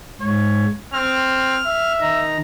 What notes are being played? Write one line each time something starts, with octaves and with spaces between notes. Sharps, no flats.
G#2 C#5
C4 F6
E5
D#3 D#4 A#5